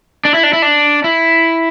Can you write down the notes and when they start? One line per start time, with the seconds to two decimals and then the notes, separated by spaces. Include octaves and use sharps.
0.25 D4
0.34 E4
0.43 D4
0.53 E4
0.62 D4
1.04 E4